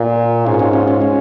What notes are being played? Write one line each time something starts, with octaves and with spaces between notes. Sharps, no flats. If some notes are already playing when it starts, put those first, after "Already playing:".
Already playing: A#2
G#2 C#4 F4
C#4 F4
C#4 F4
C#4 F4
G#3 C#4